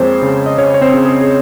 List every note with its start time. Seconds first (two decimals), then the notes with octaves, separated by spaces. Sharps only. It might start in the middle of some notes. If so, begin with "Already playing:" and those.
Already playing: F2 G#3 A#3 C4 G#4 A#4 C5 C#5
0.22 C#3
0.46 D#5
0.58 C#3 C#4 C#5
0.74 C#5
0.81 C4 C5
0.94 C#3
1.06 G#4
1.21 G#4